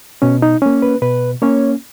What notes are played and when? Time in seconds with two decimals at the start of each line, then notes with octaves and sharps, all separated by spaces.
0.22 B2 C#4
0.42 D#4
0.62 A#3 C#4
0.82 B4
1.02 B2 B4
1.42 A#3 C#4 C#5